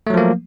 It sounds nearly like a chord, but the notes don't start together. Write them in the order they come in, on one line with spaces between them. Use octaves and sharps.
A3 F#3 F3 A#3